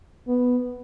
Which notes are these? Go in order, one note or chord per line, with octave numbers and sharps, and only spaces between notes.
B3